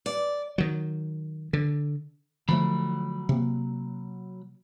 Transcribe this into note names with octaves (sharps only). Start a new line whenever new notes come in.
D5
D#3 F#3
D3
D3 F3 F#3 A3 B5
C3 A#3